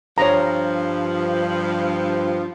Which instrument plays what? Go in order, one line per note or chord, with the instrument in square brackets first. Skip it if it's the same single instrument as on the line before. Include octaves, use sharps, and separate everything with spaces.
[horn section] G2 F3 [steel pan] C#5 A#5